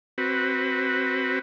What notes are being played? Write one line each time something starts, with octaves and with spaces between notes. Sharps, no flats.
C4 F#4 B4